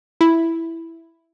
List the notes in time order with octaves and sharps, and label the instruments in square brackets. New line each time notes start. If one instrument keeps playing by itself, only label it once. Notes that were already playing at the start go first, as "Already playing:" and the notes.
[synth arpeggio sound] E4